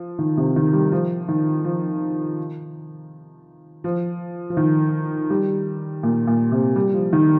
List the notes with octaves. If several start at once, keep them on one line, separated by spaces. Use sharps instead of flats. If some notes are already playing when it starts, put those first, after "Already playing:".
Already playing: F3
D#3
C3
D#3
G3
F3
D#3
F3
F3
F3
D#3
G3
A#2
A#2
C3
G3
F3
D#3